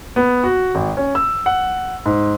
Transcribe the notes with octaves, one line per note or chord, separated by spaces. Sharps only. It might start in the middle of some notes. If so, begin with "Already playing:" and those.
B3
F#4
G#1
C#4
E6
F#5
G#2